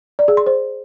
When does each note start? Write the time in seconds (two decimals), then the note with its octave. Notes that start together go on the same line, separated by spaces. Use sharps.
0.19 D5
0.28 G#4
0.37 C6
0.47 C5